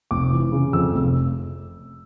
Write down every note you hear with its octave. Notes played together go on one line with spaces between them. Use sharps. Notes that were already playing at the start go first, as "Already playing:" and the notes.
F1 D6
E3
C#3
F2 E6
F1